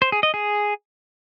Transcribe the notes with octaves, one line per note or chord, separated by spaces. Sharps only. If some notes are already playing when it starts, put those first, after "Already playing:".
C5
G#4
D#5
G#4